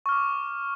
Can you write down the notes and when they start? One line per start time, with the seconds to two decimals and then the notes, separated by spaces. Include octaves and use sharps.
0.06 C#6
0.09 F6
0.12 D6